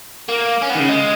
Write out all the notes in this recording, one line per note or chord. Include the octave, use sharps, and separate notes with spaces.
A#3
C#4
B3
D#3
C#3
G#3